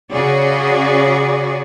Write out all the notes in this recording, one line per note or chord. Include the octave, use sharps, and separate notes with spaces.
C#3 C#4 F#4 G#4 D5